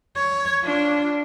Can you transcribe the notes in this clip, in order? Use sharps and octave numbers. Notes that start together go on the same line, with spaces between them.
C#5
D4 F4